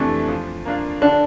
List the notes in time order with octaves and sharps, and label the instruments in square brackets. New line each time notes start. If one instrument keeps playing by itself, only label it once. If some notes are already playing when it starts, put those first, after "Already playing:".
Already playing: [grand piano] F2 C3 E3 A3 D4
F3
A#3 D4 F4
[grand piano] D3 [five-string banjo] D4